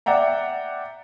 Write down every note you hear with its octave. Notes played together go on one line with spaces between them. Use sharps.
D5 E5 F#5 G5 A#5